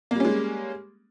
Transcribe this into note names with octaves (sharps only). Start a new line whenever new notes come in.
G3 G#3 A#3 C#4